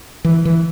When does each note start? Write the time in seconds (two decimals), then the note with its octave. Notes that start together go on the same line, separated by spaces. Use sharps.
0.25 E3
0.45 E3